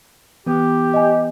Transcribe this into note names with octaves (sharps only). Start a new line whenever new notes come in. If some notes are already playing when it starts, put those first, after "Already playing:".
E3 B3 G4
D#5 G#5